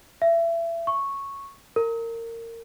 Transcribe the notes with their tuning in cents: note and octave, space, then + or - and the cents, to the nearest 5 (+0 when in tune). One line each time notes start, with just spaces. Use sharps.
E5 +30
C#6 -5
A#4 -25